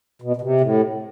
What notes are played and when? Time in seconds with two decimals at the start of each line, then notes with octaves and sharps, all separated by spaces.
0.22 B2
0.36 B2
0.41 C3
0.61 A2